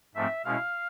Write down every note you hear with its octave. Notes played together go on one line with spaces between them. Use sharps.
G#2 F3 A3 C4 E5
B2 G#3 C#4 E4 F5